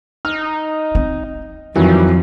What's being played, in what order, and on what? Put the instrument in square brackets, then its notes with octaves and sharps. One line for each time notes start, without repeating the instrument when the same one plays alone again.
[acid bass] D#4 [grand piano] F6
[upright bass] C4
[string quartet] F2 [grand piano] D#3 E3 F#3 [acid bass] G3